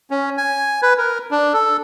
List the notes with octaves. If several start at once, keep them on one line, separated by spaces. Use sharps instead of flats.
C#4
G#5
B4
A#4
D4
A4